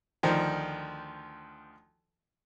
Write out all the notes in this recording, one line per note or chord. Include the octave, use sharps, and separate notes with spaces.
D2 D#3 F3